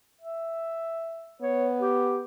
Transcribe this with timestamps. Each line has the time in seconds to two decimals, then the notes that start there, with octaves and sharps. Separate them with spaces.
0.21 E5
1.41 B3 C#5
1.81 G4